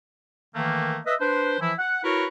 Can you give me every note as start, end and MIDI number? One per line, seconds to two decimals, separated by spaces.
0.54 0.98 51
0.54 0.98 52
0.54 0.98 57
0.54 0.98 58
1.06 1.15 71
1.06 1.15 75
1.06 1.15 76
1.20 1.57 62
1.20 1.57 71
1.20 1.57 72
1.60 1.72 52
1.60 1.72 53
1.60 1.72 64
1.79 2.00 78
2.04 2.26 64
2.04 2.26 66
2.04 2.26 70
2.04 2.26 71
2.04 2.26 73